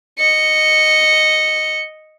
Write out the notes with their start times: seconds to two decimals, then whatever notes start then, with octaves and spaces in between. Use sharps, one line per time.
0.19 D#5 C#7